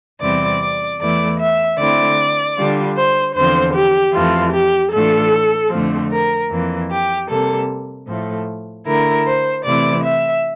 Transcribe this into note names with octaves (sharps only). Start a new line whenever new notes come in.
E2 C3 G3 C4 E4 D5
D5
E2 E3 A3 E4 D5
E5
D3 A3 C4 E4 D5
D3 G3 D4 F4
C5
E2 D3 F3 C4 C5
G4
F2 E3 A3 F4
G4
A2 E3 A3 D4 F4 A4
F2 D3 F3 A3 C4
A#4
F2 E3 A#3
G4
C3 G3 A#3 A4
A2 F3 A3
D3 A3 E4 A#4
C5
C3 E3 A3 E4 D5
E5